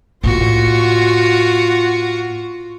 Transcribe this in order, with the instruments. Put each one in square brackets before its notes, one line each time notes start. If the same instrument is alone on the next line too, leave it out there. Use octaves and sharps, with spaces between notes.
[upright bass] A2 A#3 [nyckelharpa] F4 [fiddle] F#4 C#6